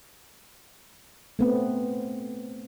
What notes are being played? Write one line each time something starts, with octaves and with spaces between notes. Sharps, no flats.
A3 B3 C4